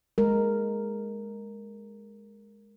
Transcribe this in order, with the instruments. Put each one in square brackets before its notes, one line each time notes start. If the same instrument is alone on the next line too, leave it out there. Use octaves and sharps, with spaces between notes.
[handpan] G#3 A#4